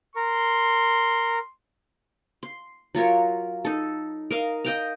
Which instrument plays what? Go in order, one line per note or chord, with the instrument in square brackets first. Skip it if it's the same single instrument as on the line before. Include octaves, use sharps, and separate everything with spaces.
[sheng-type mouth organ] A#4 [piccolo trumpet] C6
[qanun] C6
F#3 F4 A#4 C#5
D#4 A4
A#4 D#5 F5
D#5 G5 A#5